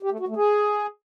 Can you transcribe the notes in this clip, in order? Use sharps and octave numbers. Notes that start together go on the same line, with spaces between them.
G4
A3
F#4
A3
G#4